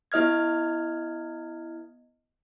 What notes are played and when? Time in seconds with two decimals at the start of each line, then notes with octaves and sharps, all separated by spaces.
0.12 B3 E4 D#5 F6 G#6